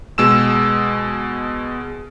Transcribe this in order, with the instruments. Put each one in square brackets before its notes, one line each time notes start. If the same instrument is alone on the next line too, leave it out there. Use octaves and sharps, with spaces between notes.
[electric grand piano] B2 G#3 E6 E7